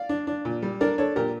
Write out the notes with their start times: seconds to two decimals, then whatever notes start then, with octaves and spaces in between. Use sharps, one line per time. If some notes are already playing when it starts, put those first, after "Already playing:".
Already playing: D5 F5
0.09 D4
0.27 D4
0.45 A#2
0.62 G3
0.81 D4 A#4 D5
0.98 D4 A4 C#5
1.16 A#2 G4 A#4